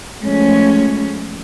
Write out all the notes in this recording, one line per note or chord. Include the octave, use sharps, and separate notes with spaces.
F3 G#3 A3 C#4